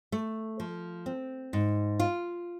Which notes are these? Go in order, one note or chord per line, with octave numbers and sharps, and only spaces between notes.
A3
F3
C4
G#2
F4